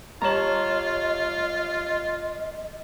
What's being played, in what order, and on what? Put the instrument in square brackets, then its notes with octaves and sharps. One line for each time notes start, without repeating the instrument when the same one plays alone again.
[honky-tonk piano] G3 C#5 F#7 [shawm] F4 [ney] D#5 [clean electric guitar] A5 A#5